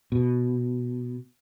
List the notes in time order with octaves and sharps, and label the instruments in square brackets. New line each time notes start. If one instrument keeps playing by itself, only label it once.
[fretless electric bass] B2